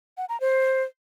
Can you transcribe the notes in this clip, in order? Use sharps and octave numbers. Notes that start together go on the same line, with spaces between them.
F#5
A#5
C5